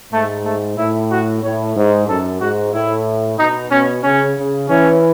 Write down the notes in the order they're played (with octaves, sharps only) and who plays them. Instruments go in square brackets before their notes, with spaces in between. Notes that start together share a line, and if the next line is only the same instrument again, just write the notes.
[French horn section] G#2 [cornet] A3
[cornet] A3
[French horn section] A2 [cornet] E4
[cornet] F#4
[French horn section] A2 [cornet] C#5
[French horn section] G#2
[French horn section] F#2 [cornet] A4
[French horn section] G#2 [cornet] F#4
[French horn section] A2 [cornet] E4
[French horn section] B2 [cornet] D#4
[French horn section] B2 [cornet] C#4
[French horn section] C#3 [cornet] C#4
[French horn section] C#3
[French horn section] E3 [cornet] C#4